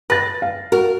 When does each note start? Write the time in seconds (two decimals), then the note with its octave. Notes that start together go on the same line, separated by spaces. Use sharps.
0.10 B4 A6 A#6
0.42 F5
0.72 F#4 A#4